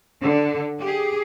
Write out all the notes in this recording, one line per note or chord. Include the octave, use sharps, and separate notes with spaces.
D3
G4 G#4